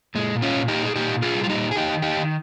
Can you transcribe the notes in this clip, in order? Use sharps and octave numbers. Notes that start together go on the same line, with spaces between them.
A#2 G#3
A#2
C#4 F4
A#2
D#4 G4
A#2
G#4
A#2 D#4 G4
A#2
F4 G#4
G3
F4
D#4 G4
A#2
G#4
F2 D#4 G4
D#3
D#4 G4
D#3